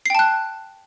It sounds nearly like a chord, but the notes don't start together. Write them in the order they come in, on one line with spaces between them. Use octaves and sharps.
C7 G5 A5 F#6